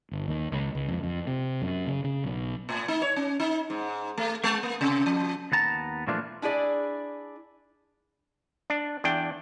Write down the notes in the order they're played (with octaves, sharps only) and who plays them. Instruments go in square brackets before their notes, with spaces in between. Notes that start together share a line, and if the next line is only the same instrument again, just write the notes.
[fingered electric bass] G1
D#2
C#2
C#2
F2
F2
C3
F#2
C#3
C#3
B1
[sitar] A2
D#4
C#5
C#4
D#4
G#2
A3
G#3
A#3
C3
F3
[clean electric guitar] D#2 B3 A5 A#5
A#2 E3 F3 A3 D4 F4
[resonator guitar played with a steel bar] D4 E4 G#4 D5
[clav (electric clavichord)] D4
E2 D4 G5